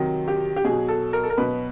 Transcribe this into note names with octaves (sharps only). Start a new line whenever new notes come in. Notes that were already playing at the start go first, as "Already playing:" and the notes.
Already playing: C3 D#3 F#3
G4
G4
B2 F#3 G#4
A4
A#4
A4
A#4
B2 F#3 B4